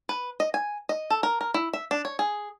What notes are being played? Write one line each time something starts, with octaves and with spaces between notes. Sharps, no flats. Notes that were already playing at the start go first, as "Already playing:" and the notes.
B4
D#5
G#5
D#5
A4
A#4
A#4
E4
E5
D4
C#5
G#4